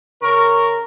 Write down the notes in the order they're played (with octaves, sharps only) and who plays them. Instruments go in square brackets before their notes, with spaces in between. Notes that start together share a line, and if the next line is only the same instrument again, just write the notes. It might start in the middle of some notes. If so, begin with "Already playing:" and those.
[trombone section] C#3 A#4 [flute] C#6